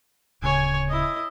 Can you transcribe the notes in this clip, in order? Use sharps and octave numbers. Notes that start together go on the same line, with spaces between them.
D1 C#3 C#5 G#5
E4 D#5